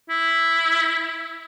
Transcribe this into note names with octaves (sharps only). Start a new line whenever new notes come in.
E4